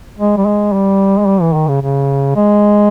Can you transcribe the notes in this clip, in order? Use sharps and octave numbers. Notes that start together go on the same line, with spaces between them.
G#3
G3
G#3
G3
G#3
G3
E3
D#3
C#3
C#3
G#3